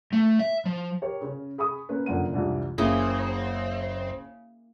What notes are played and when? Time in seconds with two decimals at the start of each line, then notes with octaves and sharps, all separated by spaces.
0.13 A3
0.39 E5
0.66 F3
1.02 G4 A#4 C#5
1.21 C#3 C#4
1.58 G#4 B5 C#6 D#6
1.89 A#3 C#4 B4
2.06 F#1 F2 D3 A#3 F#5 D#7
2.33 C2 F2 G#2 E3 D4
2.78 F#1 C#3 A#3 C4 E4 G#4